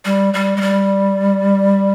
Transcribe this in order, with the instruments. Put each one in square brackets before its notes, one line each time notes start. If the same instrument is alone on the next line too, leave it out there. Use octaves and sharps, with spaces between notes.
[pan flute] G3
G3
G#3
G3